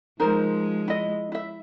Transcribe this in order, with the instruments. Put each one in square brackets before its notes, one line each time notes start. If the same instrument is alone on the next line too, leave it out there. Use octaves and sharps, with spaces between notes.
[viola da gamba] F3 G#3 [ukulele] D#4 A#4 C5
[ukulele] E4 D#5
E4 E5